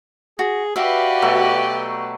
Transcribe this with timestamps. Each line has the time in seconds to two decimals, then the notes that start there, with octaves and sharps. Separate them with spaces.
0.39 F#4 G#4
0.76 F#4 G4 B4 D5 E5 F5
1.22 B2 F#3 A3